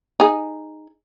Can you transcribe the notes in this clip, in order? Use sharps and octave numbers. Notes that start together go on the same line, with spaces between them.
D#4 G#4